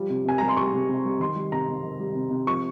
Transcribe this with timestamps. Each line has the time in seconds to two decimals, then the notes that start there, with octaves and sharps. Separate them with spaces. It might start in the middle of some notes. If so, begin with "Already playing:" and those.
Already playing: F3 G3
0.10 C3
0.25 C3 G#5
0.38 G3 A#5
0.48 C6
0.57 G3 C#6
0.73 C3
0.89 C3
1.05 G3
1.20 D#3 C6
1.36 G3
1.52 C3 A#5
1.68 C3
1.83 D#3
2.00 G3
2.15 C3
2.31 C3
2.47 F3 C#6